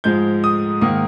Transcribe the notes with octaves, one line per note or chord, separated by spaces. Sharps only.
G#2 F3 G#3 G6
D#6
G#2 D#3 A#3 D#6